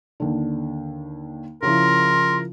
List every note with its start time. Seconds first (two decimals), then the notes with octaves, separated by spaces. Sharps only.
0.20 D#2 D3
1.63 C#3 F3 E4 A#4 C6